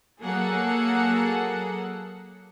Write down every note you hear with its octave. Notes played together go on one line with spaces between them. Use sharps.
F#3 A#3 G#4 A4 F#5